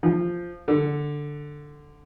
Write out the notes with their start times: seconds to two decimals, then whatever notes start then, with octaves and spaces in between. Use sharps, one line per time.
0.03 F3
0.68 D3